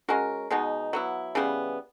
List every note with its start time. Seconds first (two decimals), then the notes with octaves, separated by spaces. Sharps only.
0.09 G#3 C#4 F#4 A#4
0.51 B2 G#3 B3 D#4
0.93 F#3 B3 E4
1.35 C#3 E3 G3 B3